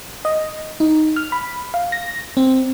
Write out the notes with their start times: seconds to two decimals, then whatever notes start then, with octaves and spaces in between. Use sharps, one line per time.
0.25 D#5
0.80 D#4
1.16 F6
1.32 B5
1.74 F5
1.92 A#6
2.37 C4